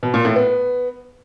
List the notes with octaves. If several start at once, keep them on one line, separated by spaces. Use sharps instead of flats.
B2
A#2
A2
B3